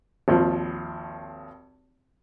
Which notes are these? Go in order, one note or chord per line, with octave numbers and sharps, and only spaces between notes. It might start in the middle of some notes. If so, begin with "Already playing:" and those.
G#1 D#2 F3